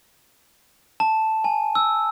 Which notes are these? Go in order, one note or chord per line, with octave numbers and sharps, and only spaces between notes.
A5
G#5
E6